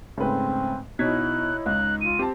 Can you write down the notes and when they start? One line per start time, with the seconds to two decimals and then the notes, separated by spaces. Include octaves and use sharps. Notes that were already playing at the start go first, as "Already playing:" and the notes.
0.18 G#2 C#3 A3 C4 B4
0.99 B2 D#4 E4 C#5 F#6 G#6 B6
1.66 C#2 F#6
2.01 F4 D#7
2.19 C4 G4 A5